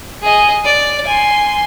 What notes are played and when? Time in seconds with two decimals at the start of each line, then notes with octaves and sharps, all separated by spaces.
0.22 G#4 D#5
0.65 D5
1.07 G#5 C6